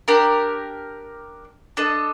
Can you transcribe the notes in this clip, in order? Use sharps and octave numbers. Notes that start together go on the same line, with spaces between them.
D4 G4 A#4
D4 A4 D#5